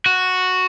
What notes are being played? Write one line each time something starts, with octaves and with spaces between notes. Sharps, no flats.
F#4